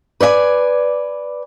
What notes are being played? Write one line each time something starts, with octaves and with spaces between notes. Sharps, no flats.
B4 D5 D#5 G#5